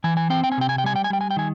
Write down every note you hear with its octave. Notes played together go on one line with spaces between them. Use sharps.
E3 G#5
G#5
C4 G5
G5
G#5
C3 G5
G#5
G5
G3 G#5
G5
G#5
G3 G5
G#5
G5
D#3 G#5